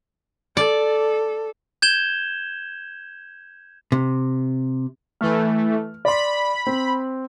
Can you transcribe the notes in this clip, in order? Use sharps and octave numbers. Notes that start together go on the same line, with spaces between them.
A4 D5
G6 G#6 E7 G7
C3
E3 A3 F6
D5 B5 C6
C4